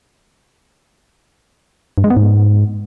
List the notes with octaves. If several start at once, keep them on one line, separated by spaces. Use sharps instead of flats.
G2
G#3
B3
G#2